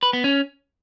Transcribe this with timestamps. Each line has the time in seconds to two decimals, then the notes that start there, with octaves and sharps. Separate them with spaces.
0.03 B4
0.13 B3
0.24 C#4